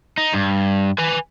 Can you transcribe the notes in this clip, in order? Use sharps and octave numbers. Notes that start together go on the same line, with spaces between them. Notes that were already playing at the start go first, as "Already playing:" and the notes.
D#4
G2
B4 G#5